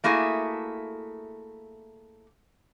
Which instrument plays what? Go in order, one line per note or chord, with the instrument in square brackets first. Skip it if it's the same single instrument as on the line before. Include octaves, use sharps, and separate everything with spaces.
[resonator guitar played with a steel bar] A3 A#3 E4 F#4 G#4